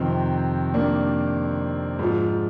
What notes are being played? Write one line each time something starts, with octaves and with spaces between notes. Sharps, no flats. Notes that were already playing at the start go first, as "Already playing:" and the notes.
Already playing: F2 C3 D#3 C4
A#3 D4
G#2 F3